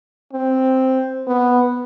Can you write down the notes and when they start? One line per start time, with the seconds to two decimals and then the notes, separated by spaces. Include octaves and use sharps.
0.33 C4
1.27 B3